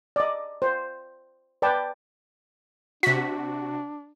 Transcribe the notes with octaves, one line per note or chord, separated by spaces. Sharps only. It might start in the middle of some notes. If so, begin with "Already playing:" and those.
D5 D#5
C5
B4 D5 G5 A5
C3 D4 F#4 B6